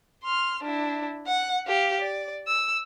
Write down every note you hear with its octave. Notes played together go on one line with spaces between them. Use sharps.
C6 F6
D4 E4
F#5
G4 F5
D5
E6